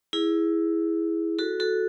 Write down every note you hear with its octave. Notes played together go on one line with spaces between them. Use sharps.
E4 G#4
F#4 A4
F#4 A4